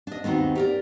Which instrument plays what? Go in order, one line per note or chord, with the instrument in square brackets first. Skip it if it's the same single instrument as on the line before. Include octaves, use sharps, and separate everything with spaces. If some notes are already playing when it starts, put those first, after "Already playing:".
[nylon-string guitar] D4 D#5
D#2 B3 C4 D#4 F#4
G4 A#4 D5